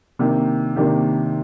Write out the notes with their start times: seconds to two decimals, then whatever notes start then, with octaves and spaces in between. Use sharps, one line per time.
0.19 C3 D#3 A#3 D4 G4
0.76 C3 D#3 A#3 D4 G4